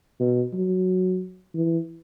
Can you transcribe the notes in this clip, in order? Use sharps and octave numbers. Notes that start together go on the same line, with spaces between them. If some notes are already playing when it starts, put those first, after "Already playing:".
B2
F#3
E3